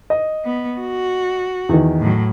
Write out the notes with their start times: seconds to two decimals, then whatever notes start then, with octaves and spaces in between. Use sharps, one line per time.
0.10 D#5
0.45 B3
0.80 F#4
1.69 E2 D#3
2.00 A2 F#3